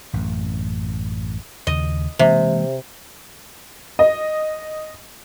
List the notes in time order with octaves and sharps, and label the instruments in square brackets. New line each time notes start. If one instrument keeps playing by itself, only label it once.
[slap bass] A1 F#2
[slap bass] D#2 C#3 [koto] D#5
[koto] C3 [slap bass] E3 G#3 A#3
[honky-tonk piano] D#5